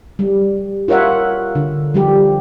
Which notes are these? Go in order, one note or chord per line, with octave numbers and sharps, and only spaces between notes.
G3
F4 A#4 C#5 E5 F#5
D3
F3 G3 G4